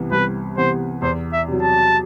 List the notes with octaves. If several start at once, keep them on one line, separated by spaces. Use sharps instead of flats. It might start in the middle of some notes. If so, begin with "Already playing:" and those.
Already playing: C2 C3 E3 B3
C2 B4
C3 E3 B3 C5
E2 C5
E5
C3 F#3
A5